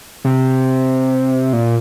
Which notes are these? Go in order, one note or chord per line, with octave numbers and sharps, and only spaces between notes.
C3
A#2